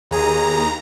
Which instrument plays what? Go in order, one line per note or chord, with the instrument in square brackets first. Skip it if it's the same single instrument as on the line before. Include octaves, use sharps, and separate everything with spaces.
[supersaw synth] D#2 A#5 [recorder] G#4